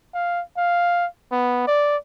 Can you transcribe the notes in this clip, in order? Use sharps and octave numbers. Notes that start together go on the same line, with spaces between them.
F5
F5
B3
D5